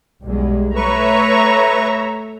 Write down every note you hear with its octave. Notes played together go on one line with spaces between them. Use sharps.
B1 E2 G3 G#3
A3 B4 C#5 E5 A#5 C#6